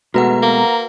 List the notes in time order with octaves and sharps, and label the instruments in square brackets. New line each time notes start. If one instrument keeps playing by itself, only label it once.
[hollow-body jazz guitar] B2 G#3 A3 [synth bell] F#4 B4 F#5 [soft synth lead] A#5
[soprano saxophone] A#3